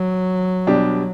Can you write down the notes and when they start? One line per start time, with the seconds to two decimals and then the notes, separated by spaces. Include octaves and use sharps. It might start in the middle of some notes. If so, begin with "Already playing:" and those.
Already playing: F#3
0.67 B2 G3 D4 G4